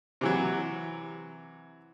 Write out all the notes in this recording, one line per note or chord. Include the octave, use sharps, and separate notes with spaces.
C3 E3 F#3